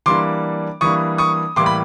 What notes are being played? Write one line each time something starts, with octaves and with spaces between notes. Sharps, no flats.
E3 G3 A#3 D4 C6 D6
E3 G3 A#3 D4 C#6 D#6
C#6 D#6
A2 E3 G3 A#3 C6 D6
B5